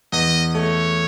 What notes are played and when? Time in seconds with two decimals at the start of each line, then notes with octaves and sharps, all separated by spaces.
0.13 E2 D#5
0.55 A3 C#5